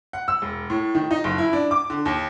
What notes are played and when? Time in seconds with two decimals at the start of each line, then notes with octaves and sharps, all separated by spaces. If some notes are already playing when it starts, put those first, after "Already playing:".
0.13 F#5
0.28 E6
0.42 E1
0.70 A2
0.95 D#3
1.11 D#4
1.24 F#1
1.38 E4
1.53 D4
1.71 D6
1.90 D3
2.06 D#2